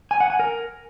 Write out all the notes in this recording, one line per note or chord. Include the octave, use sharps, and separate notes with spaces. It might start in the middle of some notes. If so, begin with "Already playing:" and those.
G#5
F#5
G#5
A#4